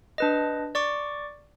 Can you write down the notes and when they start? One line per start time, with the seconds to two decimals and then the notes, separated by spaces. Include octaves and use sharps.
0.18 D4 B4 D#5
0.75 D5 C#6 D6